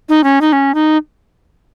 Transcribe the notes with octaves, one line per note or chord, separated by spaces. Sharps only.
D#4
C#4
D#4
C#4
D#4